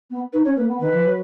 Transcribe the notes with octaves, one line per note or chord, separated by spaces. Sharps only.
B3
D#4 B4
C#4 C#5
A#3 B4
B3
D#3 B4
F3
F#3